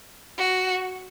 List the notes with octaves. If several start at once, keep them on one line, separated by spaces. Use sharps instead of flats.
F#4